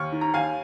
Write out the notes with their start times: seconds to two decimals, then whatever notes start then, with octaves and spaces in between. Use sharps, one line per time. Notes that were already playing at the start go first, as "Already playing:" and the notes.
Already playing: D#2 C#6 F6
0.12 D#3
0.21 A#5
0.34 D#2 F5 G#5